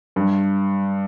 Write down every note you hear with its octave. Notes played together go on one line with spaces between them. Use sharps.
G2